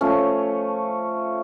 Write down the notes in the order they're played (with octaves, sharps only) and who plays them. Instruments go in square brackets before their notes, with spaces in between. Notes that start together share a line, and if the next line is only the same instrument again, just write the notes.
[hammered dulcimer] F3 A3 C#4